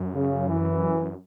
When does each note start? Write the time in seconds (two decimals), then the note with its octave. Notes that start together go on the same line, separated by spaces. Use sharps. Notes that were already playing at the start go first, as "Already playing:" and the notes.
Already playing: F#2
0.14 C#3
0.48 E3